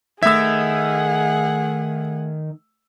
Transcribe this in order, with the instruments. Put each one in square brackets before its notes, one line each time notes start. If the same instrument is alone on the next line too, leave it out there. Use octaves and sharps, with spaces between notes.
[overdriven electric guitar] D#3 [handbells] A3 G#6 [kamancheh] G#4 F#5 [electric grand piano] E5 E6